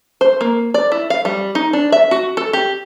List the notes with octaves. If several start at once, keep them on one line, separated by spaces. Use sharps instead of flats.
C5
A#3
D5
E4
F5
G3
D#4
D4
E5
F#4
A4
G4